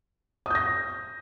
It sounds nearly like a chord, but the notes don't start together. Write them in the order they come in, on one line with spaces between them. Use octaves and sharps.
D#6 G6 A#6